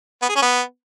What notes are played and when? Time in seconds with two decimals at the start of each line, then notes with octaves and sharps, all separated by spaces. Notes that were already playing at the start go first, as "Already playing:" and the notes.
0.23 B3
0.29 G#4
0.36 C#4
0.42 B3